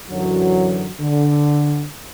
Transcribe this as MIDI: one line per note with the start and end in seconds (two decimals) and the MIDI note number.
0.11 0.89 42
0.11 0.89 50
0.11 0.89 52
0.11 0.89 54
1.01 1.85 50